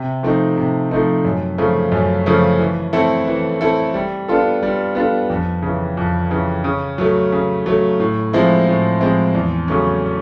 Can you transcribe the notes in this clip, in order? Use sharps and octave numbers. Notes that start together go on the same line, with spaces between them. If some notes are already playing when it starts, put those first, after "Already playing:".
Already playing: C3
F3 A3 C4 D#4
C3
F3 A3 C4 D#4
F#2
C#3 F3 A3
F#2
C#3 F3 A3
E3
A3 C4 E4 A4
E3
A3 C4 E4 A4
G3
B3 D4 F4 A4
G3
B3 D4 F4 A4
F2
C#3 E3
F2
C#3 E3
C#3
F#3 A3
C#3
F#3 A3
A2
F3 G#3 C4 E4
A2
F3 G#3 C4 E4
E2
C#3 F#3 A3 C#4